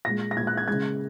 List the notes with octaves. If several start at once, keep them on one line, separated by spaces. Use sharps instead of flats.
A#2 G#3 A#6
A#6
A#2 G#3 G#6
F#6
G#6
C#3 G#3 G#6